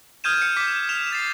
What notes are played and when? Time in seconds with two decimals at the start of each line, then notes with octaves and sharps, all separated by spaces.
0.24 D#6 F6 G6 G#6 D#7 E7
0.42 C#7
0.57 D6 G6 B6
0.89 F6 E7 F7
1.12 A6 C7